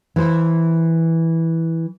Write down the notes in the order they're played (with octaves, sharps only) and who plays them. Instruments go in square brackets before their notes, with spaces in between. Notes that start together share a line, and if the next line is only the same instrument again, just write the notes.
[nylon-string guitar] E3 C5